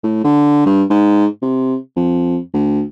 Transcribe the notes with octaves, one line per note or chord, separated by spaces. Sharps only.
A2
D3
G2
G#2
C3
F2
D2